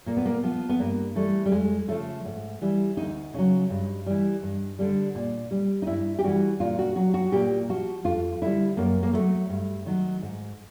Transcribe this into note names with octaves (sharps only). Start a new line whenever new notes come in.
A#2 A#3
B3
A#3
F3 B3
B3
G2 A#3
E3 G3 A3
G3
F2 G#3
C#3 F3 A3
G#2
E3 G3
D2 D#4
C#3 F#3
G2
E3 G3
G2
D3 G3
A#2
G3
D#4
G2 E4
G4
E3 G3 F#4
A#2 F4
F#4
F#3 F#4
F#4
A#2 G4
F3 F#4
F2 F4
D3 G3 E4
F#2 A#3
A#3
D#3 F#3 A3
G2
D#3 F#3
G#2